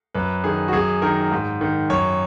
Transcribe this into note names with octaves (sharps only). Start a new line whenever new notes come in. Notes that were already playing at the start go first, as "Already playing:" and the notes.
F#2 B4
D#3 G#4
F#4
F#2 G#4
D#3 A#4
G#2
D#3
F#2 C#5